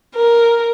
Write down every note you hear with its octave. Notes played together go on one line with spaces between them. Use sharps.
A#4